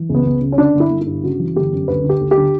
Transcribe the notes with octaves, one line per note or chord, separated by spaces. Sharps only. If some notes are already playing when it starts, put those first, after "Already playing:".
Already playing: E3
C#2
B3
C#2
C#3
C#4
D3 D4
G1
E4
G1
G2 E4
C#3 F#4
E3
G1 G4
F#2
D2 B4
D3
G4
D2
G4
D3